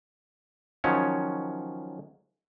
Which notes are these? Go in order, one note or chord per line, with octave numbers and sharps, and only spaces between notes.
D#3 F3 F#3 C#4 C#5